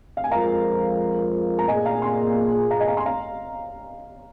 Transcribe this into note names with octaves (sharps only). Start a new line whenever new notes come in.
F5
G#5
F2 F3 G#3 F4 A#4 F5 A#5
A#5
A#2 A#3 G#4 D#5 G#5
F5 A#5
G#5 C6
F5 A#5
D#5 G#5
F5 A#5
G#5 C6
F5 A#5